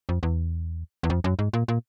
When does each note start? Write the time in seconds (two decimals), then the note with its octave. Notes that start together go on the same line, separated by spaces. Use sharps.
0.09 F2
0.23 E2
1.03 E2
1.10 F2
1.24 F#2
1.39 G#2
1.53 A#2
1.68 A#2